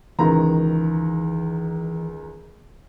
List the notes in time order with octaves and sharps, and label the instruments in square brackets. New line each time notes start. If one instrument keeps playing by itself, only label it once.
[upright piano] C#2 D#3 A#5 [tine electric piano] E3